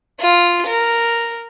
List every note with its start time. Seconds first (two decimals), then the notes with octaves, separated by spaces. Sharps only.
0.20 F4
0.67 A#4